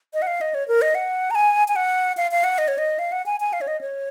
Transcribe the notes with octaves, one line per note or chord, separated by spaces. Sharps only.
D#5
F#5
F5
D#5
C#5
A#4
D#5
F#5
A#5
G#5
G#5
F#5
F5
F5
F#5
D#5
C#5
D#5
F5
F#5
G#5
G#5
F5
C#5
D#5
C#5